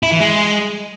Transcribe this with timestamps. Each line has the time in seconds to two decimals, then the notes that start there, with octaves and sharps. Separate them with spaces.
0.03 E4
0.11 E3
0.20 G#3